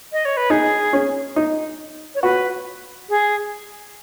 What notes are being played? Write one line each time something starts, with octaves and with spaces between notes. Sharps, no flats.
D#5
C#5
B4
D#4 G#4
C#4
D#4
C#5
F#4 B4
G#4